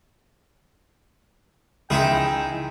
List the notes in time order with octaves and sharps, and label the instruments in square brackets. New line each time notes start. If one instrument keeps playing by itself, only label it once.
[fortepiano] C#2 [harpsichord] D#4 E4 G#4 [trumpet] G5